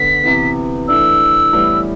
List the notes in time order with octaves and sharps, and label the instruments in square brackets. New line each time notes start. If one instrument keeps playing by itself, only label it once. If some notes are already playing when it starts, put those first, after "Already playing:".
Already playing: [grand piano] D3 B3 [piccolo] B6
[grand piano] C3 E3 B3
[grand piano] E3 A3 D4 [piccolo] E6
[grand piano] A2 E3 G3 B3